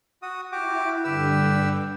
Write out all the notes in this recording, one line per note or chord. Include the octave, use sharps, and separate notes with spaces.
F#4 D#6
E4 F#4 G4 D6
G2 D3 G4 B4 E6